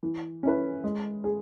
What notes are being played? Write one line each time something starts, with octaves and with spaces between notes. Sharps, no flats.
E3
C#4 E4 B4
G#3
G#4